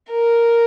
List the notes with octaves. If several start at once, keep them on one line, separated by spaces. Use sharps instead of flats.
A#4